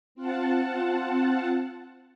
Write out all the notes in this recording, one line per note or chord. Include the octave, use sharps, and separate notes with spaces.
C4 F4 F#5 A5